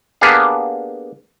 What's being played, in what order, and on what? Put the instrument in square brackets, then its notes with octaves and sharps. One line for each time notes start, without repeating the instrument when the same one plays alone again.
[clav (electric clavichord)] A#3 B3 D4 G4 G#4 F5